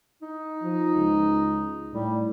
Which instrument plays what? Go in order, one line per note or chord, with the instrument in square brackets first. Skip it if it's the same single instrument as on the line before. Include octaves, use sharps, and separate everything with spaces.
[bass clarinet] D#4
[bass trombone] F3
C#2
[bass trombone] A2 [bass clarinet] G3